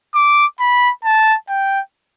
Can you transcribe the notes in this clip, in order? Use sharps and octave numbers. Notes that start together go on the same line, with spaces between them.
D6
B5
A5
G5